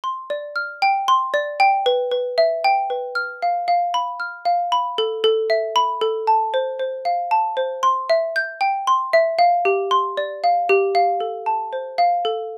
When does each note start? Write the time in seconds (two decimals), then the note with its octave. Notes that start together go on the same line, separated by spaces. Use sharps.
0.04 C6
0.30 D5
0.56 F6
0.82 G5
1.08 C6
1.34 D5
1.60 G5
1.86 B4
2.11 B4
2.38 E5
2.64 G5
2.90 B4
3.15 F6
3.42 F5
3.68 F5
3.94 B5
4.20 F6
4.45 F5
4.72 B5
4.98 A4
5.24 A4
5.50 E5
5.76 B5
6.01 A4
6.27 A5
6.54 C5
6.79 C5
7.05 F5
7.31 A5
7.57 C5
7.83 C6
8.10 E5
8.36 G6
8.61 G5
8.87 C6
9.13 E5
9.39 F5
9.65 G4
9.91 C6
10.17 D5
10.44 F5
10.69 G4
10.95 F5
11.20 A4
11.46 A5
11.73 C5
11.98 F5
12.25 A4